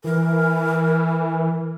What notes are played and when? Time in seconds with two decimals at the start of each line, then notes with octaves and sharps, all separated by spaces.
0.04 E3 A#4